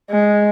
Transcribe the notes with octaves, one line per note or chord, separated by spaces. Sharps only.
G#3